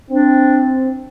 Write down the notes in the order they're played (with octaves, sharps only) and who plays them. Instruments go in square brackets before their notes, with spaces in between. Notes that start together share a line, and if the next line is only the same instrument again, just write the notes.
[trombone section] C4 [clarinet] D4